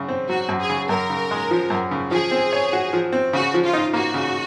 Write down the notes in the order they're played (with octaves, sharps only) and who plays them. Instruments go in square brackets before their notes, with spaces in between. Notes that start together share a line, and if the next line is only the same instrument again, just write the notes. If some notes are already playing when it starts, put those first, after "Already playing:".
Already playing: [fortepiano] F#2 C#3
C4
[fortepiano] F#3 [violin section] F#4
[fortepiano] F#2
[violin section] G#4
[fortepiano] C#3
[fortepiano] F#2 [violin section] A#4
[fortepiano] C#3
G#3
F3
F#2
C#3
[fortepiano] F3 [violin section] G#4
[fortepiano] C4
C#5
F#4
F3
C4
[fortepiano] C#3 [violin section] F#4
[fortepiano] F3
[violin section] F4
[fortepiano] D#4
[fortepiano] A#3 [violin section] F#4
[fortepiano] C#3